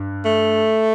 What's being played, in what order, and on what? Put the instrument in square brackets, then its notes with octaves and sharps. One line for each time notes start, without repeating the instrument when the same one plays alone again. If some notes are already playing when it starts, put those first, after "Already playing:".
Already playing: [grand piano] G2
[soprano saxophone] A3